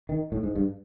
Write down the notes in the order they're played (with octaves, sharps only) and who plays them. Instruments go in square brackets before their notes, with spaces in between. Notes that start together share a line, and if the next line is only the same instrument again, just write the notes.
[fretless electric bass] D#3
A2
G#2
G2